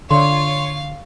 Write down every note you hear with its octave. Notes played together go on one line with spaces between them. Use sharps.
D3 F4 C#5 F5 C6